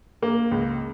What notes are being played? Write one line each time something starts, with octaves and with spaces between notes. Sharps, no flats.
A#3
C#2